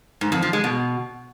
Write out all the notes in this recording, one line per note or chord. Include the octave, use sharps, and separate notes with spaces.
G#2
F2
F3
G#3
B2